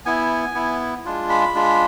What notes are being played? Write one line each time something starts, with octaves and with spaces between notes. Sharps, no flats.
B3 E4 G#5
B3 E4
G#3 D4 F4
B5
G#3 D4 F4